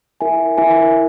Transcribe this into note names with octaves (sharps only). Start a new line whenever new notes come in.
E4 A#4 E5 G#5
E4 A#4 E5 G#5